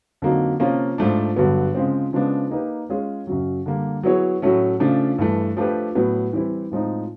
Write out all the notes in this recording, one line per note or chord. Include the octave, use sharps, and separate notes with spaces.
F2 D3 F#3 A#3 D#4
C3 F3 A#3 C#4 F4
G#2 F3 A3 D4
G2 D3 F#3 B3
C#3 F3 G#3 C4
C#3 F3 G#3 B3 D4
A#3 D#4 G4 B4
G#3 C#4 F4 G#4 C#5
F#2 C#3 F#3
D3 G3 A#3
F#3 B3 E4 G#4 C#5
A2 F#3 A3 C#4
C#3 F3 A3 D4
G2 E3 A3
F3 A3 D4 G4 B4
A2 F#3 B3
E3 G3 C4 E4
A2 F3 G#3 C4 D#4